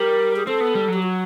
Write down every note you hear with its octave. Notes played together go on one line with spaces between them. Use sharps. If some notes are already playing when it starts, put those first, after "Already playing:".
Already playing: G3 A#4
G#4
C4 A4
B3
G3
F#3 G4
F#4